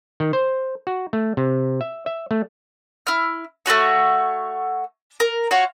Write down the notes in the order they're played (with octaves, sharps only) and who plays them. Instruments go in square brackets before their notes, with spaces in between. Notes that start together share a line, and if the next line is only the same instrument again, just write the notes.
[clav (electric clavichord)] D#3
C5
F#4
A3
C3
E5
E5
A3
[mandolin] E4 F6
A3 F4 F#4 C#5
A#4
F4 F#4 C#5